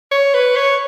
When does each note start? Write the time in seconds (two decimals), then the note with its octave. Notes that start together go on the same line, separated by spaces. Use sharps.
0.11 C#5
0.34 B4
0.56 C#5